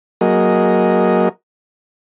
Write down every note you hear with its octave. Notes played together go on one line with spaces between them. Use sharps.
F#3 A#3 F#4 G#4 A#4 D#5